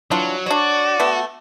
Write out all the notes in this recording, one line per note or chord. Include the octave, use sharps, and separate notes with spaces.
E3 F#3 D4 F4
D4 F#4 C#5 D5
A3 B3